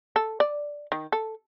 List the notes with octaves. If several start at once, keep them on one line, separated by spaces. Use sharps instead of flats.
A4
D5
D#3
A4